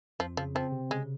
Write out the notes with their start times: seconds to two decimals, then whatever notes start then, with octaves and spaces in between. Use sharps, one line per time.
0.19 F2 F3
0.37 C#3 F3
0.55 F3 C4
0.72 C3
0.90 C#3 G#3